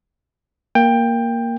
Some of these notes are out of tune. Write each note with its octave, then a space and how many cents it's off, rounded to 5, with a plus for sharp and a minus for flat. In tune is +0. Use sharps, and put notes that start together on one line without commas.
A#3 +0 G5 +15